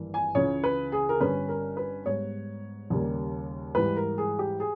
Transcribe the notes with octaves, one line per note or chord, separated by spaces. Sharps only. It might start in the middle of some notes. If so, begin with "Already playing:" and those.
Already playing: G#1 G2 E3 A#3
G#5
C#2 C#3 E3 C#5
B4
G#4
A#4
G1 G2 G3 C#4 B4
A#4
B4
G#2 G3 B3 C#5
D#2 C#3 G3 A#3
G#2 E3 G3 B4
A#4
G#4
G4
G#4